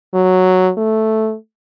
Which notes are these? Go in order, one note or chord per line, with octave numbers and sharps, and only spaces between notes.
F#3
A3